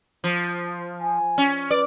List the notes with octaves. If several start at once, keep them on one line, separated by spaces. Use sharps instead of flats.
F3
G#5
C#4
B4 D5